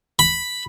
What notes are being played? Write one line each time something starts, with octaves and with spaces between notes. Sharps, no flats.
B5